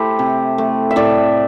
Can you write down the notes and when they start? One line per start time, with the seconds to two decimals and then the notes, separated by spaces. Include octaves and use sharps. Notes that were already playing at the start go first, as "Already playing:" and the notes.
Already playing: A3 E4 G4 A4 C5
0.19 C3
0.58 A3
0.91 E5
0.96 A2 A4 D5